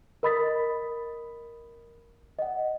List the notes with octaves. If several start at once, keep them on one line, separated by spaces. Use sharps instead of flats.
A#4 D#5 B5 D#6 A6 B6
D#5 F#5